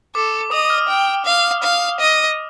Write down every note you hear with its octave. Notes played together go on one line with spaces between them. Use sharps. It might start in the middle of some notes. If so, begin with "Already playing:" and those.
A4 D6
D#5 D#6
F6
G5
F5
F5
D#5